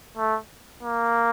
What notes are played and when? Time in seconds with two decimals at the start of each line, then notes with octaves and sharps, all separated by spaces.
0.17 A3
0.83 A#3